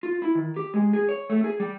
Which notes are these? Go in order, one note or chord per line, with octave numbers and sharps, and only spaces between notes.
F4
E4
D#3
G4
G#3
G#4
C#5
A3
G#4
G3